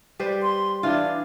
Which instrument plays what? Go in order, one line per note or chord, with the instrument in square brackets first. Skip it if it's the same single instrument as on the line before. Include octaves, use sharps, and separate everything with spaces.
[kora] G3 B4 C5
[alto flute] C6
[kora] E3 F4 [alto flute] D4